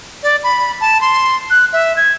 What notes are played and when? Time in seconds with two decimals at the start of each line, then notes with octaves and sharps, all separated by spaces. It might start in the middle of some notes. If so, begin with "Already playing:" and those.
0.23 D5
0.44 B5
0.81 A5
1.01 C6
1.50 F#6
1.73 E5
1.97 G#6